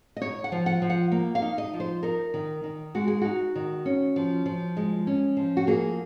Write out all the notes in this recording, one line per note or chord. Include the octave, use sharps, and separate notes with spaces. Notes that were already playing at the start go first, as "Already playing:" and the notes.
D#5
D#4 C#5
F#5
F3
F#5
F3
F#5
A#3
F5
D#4
D#5
F3
C5
D#4 A#4
D#3
D#3
G#3 F#4
G#4
D#4 F#4
D#3
C#4
F3
F3
G#3
C#4
F3
F#4
A#3 G#4